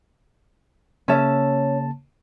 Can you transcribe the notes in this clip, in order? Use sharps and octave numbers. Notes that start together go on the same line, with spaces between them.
C#3 A#3 C#4 E5 A5